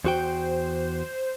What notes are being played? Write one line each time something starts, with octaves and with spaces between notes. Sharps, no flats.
E2 F#4 C5 G5